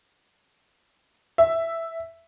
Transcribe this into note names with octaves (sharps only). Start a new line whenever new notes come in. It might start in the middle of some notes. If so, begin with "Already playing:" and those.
E5